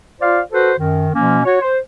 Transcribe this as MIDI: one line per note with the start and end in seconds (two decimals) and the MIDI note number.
0.21 0.40 65
0.21 0.40 72
0.21 0.40 74
0.21 0.40 77
0.52 0.72 66
0.52 0.72 69
0.52 0.72 71
0.52 0.72 72
0.77 1.09 42
0.77 1.09 51
1.14 1.40 47
1.14 1.40 53
1.14 1.40 58
1.14 1.40 61
1.45 1.60 66
1.45 1.60 73
1.61 1.78 72